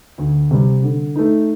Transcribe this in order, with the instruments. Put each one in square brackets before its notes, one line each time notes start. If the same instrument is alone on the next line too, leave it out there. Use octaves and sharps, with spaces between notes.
[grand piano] D2
C3 G3
D3
A3 D#4